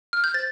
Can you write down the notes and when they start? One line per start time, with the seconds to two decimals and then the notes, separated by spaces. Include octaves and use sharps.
0.13 F6
0.24 G6
0.34 C5 A6